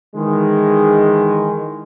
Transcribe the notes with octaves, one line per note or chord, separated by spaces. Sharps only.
D#3 E3 G#3